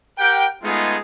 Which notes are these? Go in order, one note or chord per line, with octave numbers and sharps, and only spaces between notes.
G4 A#4 F#5 G5
G#3 A3 B3 D#4 F4 G#4